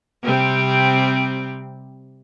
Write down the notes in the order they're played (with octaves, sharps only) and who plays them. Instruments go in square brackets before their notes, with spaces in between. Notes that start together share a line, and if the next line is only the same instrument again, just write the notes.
[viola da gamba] C3 G3 C4